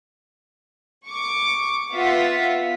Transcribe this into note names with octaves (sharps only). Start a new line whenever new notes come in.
C#6 D6
B3 F4 E5 F#5 B6